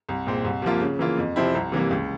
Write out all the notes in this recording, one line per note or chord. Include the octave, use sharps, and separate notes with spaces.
C2
A#2 G#3 C4
C2
C3 F3 A#3 F4
C#3
E3 A#3 F4
F2
C3 F3 C4 E4
C2
C3 E3 G3 A#3
C#2